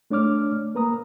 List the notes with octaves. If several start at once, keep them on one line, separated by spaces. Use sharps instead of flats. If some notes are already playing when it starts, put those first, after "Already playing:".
A3 D4 C#5 D6 F6
A#3 B4 A#5 D#6